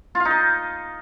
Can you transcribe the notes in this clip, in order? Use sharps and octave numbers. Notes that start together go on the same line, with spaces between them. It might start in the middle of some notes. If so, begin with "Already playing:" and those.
F4
F5
D#4
D#5